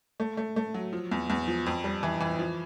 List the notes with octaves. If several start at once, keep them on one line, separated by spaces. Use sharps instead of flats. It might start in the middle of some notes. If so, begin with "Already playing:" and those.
A3
A3
A3
F#3
F3
E2
E2
F3
F2
G3
E3
E3
F3